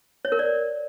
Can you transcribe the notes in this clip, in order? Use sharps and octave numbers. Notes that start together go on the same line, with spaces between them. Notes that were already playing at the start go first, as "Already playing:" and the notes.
C#5
A#4
D5